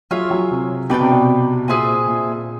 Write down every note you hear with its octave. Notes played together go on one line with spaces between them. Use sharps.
F#3 F4 G#4 C#5 E5
F#3
C3
B2 G4 B4 D5 G5
C3
B2
A#2 G#4 C5 E5 G#5
A#2